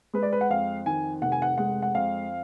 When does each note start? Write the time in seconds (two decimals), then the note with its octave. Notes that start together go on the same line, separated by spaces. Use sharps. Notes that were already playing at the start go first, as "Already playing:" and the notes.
0.13 G#3 B4
0.22 D5
0.33 B4
0.41 F#5
0.50 F2 F5
0.86 D#3 G#5
1.22 F1 F#5
1.32 G#5
1.42 F#5
1.58 G#3 F#5
1.82 F#5
1.94 F2 F5